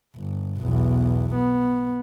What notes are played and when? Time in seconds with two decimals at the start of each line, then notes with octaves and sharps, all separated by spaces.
0.16 G1
0.61 B1 E2
1.35 B3